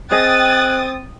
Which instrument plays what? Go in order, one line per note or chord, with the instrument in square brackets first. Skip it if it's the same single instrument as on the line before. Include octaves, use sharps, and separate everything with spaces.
[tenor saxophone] C4 [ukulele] G#4 D#5 [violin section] G5 D#6 A6 [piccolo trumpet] F#6